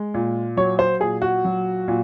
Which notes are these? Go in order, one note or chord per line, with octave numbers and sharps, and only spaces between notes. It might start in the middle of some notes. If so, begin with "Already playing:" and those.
Already playing: G#3
A#2
F#3 C#5
C5
A#2 G#4
F#4
F#3
A#2